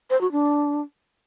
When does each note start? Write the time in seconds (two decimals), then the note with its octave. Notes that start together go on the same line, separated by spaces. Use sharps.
0.10 C5
0.21 F#4
0.32 D4